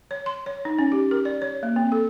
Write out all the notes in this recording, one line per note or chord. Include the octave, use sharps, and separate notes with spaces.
C#5
C6
C#5
D#4
C#4
G4
A#4
D5
C#5
A#3
C4
A4